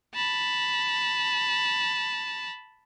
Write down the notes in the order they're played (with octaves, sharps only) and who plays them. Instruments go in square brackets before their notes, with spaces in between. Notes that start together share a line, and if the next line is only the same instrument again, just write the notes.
[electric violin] A5 B5